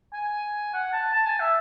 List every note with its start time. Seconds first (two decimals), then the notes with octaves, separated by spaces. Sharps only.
0.13 G#5
0.74 F#5
0.93 A5
1.13 A5
1.26 G#5
1.40 E5